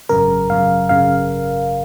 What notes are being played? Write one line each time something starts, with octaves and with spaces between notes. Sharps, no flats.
G#1 F#2 C#3 A#4
G#1 F#2 C#3 F5
G#1 F#2 C#3 F5